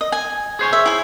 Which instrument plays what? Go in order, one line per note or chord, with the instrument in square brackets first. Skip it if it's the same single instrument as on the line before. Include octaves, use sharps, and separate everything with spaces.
[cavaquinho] D#5
G#5
[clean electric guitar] G#4 C5 C#5
[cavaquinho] E5
E4 G#5